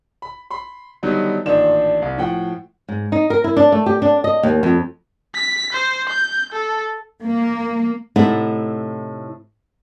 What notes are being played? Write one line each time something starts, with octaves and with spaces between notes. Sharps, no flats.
B5
B5 C6
D3 D#3 F#3 G3 B3 D#4
A1 A#2 D#3 D4 E7
C2
A2 F3 F#5 G5
G#2
D#4
A#4
E4
D4
A3
G4
D4
D#5
D#2
F2
B6
C5
G6
A4
A#3
A2 C3 A3 D#4 E4 F#5